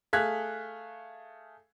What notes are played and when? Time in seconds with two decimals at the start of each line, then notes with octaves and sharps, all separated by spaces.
0.13 A3 G#4 F5 F#6 G#6 B6